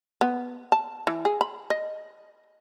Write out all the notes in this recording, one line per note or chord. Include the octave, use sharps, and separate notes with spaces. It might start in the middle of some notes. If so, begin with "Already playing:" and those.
B3
A5
E3
G#4
B5
D#5